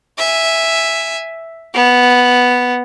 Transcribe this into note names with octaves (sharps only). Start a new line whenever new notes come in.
E5 G#5
B3